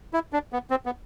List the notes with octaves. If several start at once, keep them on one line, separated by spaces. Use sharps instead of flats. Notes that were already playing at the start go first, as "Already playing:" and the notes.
E4
D4
B3
C4
B3